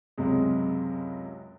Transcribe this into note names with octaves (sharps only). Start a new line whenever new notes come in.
C#2 F#2 C3 G#3